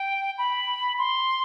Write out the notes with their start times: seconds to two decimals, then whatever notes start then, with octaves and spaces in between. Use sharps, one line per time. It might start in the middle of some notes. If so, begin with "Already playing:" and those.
Already playing: G5
0.38 B5
0.99 C6